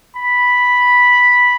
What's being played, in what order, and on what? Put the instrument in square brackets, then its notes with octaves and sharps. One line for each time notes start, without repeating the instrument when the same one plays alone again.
[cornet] B5